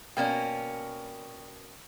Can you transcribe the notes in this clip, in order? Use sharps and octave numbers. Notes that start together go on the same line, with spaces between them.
B2 A#3 C#4 D5 G5